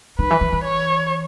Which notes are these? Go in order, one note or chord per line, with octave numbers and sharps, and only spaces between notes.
D#3 B4
E3
E3
E3
C#5